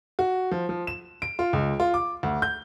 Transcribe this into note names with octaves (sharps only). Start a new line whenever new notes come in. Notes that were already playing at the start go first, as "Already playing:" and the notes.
F#4
F3
F3
E7
D7
F4
C#2
F4
D6
D2
G6